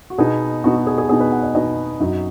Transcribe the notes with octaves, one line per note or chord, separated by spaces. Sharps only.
F#4
B2 B3 D#4 G#4
B2 B3 D#4 F#4
F#4
G#4
G#4
B2 B3 D#4 G#4
B4
F#5
D#5
B2 B3 D#4 D#5
F#2 F#3 D#4